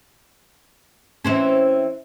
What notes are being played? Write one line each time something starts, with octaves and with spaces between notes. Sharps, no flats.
E3 C4 C#4